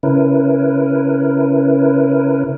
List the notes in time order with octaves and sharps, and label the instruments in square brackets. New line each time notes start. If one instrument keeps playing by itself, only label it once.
[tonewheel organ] C#3 C#4 E4 A#4 B4